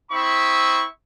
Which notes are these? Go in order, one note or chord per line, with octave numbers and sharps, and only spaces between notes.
C4 E4 E5 B5 C#6 D#6